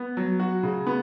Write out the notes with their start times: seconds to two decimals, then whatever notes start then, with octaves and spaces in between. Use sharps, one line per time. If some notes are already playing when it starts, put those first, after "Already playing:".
Already playing: B3
0.17 F#3
0.39 F#4
0.63 C#3
0.87 B3